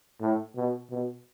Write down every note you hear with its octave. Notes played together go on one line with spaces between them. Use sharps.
A2
B2
B2